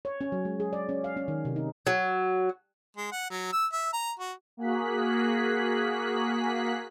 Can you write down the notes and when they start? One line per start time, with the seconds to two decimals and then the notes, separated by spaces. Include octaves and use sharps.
0.05 C#5
0.21 C#4
0.32 F#3
0.45 G#3
0.60 G#4
0.73 D5
0.89 C#4
1.04 F5
1.17 C#4
1.28 D#3
1.45 C3
1.56 D#4
1.87 F#3
2.97 G#3
3.12 F#5
3.30 F#3
3.52 E6
3.73 E5
3.93 A#5
4.19 F#4
4.57 A#3 F#4 G#4 F#6 B6